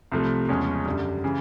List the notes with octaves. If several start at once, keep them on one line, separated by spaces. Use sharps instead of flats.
C2 C3 F3 A3
E2 C#3 F3 G#3 C#4
F#2 D3 G3
C#3 E3